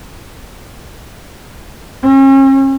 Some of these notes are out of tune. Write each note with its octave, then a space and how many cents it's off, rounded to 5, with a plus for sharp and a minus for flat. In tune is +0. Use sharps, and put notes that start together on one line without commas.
C#4 -40